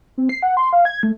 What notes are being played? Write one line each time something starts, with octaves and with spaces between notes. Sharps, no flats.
C4
C7
F#5
C6
F5
G#6
A3